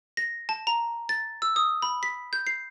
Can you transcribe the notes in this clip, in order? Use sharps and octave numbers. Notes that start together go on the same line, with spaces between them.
A#6
A5
A#5
A6
E6
D#6
B5
B6
G6
C7